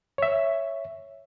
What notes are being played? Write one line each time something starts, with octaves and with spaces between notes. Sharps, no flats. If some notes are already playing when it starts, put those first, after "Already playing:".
C#5 E5